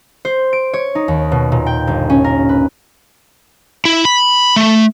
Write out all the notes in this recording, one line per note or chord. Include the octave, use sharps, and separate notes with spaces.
C5
D7
C#5
D#4
D#2
B2
A#2
G5
G1
C#4
A#4
B4
E4
B5
A3